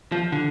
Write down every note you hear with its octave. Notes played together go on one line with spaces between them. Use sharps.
F3
D3